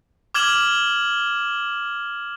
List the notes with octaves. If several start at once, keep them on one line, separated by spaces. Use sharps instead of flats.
D6 F6 G#6 E7 F#7